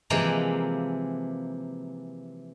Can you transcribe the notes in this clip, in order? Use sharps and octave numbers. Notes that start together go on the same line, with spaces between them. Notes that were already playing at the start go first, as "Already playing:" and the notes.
C3 E3 F3 G#3 A#3